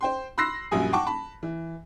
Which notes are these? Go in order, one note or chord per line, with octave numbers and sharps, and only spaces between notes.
C5 G5 C6
B5 C6 E6 F#6 A#6 C7
A#1 F#2 G3 G#5 D#6
F#5 G5 A5 C#6 D6
A5 B5
E3